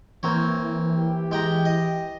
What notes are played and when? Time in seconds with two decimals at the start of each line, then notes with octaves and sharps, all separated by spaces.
0.23 E3 A#3 C4 C#5
0.98 G4
1.31 G#3 G5 A#5
1.65 D#5